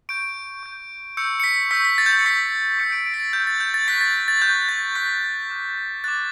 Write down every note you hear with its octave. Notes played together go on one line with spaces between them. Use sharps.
C#6 G6 D7
C#6 G6
C#6 E6 G6 C#7
C#7
B6
C#6 E6 G6 B6
B6
A6
G6
A6
C#7
C#6 E6 G6 B6
C#6 E6 G6 C#7
D7
D7
B6
A6
C#6 F#6 G6
A6
G6
A6
C#6 F#6 B6
A6
A6
C#6 F#6 G6
A6
C#6 F#6 B6
D6 F#6
D6 F#6 A6